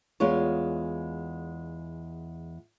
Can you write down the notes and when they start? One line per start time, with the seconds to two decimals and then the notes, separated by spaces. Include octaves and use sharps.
0.20 E2 G#3 F4 C#5